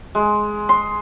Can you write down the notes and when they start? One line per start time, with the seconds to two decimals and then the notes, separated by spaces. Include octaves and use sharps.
0.15 G#3
0.69 C6